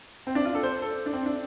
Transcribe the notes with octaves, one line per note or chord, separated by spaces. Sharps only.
C4
D4
F4
A4
C5
A4
D4
C4
D4